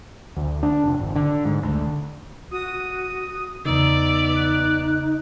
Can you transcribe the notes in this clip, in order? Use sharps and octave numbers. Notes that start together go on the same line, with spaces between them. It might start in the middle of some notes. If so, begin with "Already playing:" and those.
D2
D4
F1
G#1
D3
G#2
D2
F#4 D#6
E2 C#3 B3 D#4 D5 E6
F#6